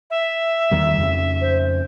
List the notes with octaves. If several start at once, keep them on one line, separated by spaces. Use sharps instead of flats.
E5
E2 D#3 G3
F2 C#3
C5